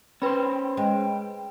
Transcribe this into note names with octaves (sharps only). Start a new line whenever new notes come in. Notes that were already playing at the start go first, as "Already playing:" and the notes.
C#4 B4 C5 G5 B5
G#3 G5